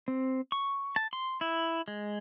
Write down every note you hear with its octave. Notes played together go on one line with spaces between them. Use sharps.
C4
C#6
A5
C6
E4
G#3